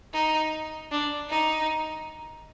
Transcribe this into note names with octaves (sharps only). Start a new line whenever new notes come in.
D#4
D4
D#4